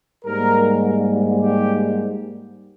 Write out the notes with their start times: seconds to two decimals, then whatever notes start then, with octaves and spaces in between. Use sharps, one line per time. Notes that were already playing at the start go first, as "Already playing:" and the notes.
0.25 G#2 G3 A#3 A#4
1.41 G4